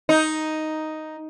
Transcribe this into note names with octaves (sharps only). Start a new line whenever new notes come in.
D#4